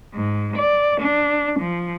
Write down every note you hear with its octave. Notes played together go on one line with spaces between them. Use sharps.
G#2
D5
D4
F3